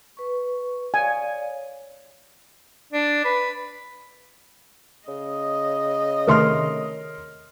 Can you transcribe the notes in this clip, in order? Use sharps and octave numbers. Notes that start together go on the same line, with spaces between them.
B4 C#6
C#5 D5 F5 G#5
D4
B4
C#3 D#5
C3 D#3 A3 A#4 C6 F6